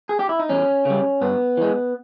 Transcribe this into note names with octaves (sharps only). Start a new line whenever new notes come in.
G#4
G4
E4
D#4
E2 C#4
C#3 G3
G2 B3
E3 G#3